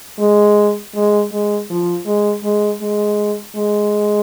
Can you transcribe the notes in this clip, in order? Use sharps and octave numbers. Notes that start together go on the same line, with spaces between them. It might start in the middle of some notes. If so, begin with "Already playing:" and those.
G#3
G#3
G#3
F3
G#3
G#3
G#3
G#3